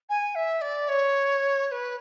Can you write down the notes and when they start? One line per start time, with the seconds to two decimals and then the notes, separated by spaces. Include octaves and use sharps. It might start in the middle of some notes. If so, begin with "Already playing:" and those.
0.09 G#5
0.35 E5
0.61 D5
0.88 C#5
1.68 C#5
1.71 B4